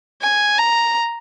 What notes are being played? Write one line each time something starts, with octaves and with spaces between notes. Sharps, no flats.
G#5
A#5